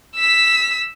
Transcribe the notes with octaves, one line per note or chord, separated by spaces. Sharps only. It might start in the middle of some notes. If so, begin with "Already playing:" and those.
E6 B6